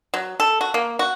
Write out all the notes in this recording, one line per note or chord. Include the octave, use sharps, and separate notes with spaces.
F#3
A4
F#4
A#3
F#4